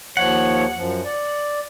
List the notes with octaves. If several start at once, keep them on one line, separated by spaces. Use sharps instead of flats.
D#2 F3 C#5 F#5
F#2 F3
D5